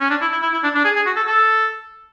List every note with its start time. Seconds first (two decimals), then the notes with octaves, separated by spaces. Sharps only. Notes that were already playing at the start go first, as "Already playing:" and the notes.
0.01 C#4
0.10 D4
0.21 E4
0.32 E4
0.42 E4
0.53 E4
0.64 D4
0.75 D4
0.85 G#4
0.96 G#4
1.06 F#4
1.16 A4
1.27 A4